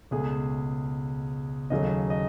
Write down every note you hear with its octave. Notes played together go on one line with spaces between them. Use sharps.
C#2 B2 A3 G#4
D#2 C#3 F#3 A3 D#5
D#5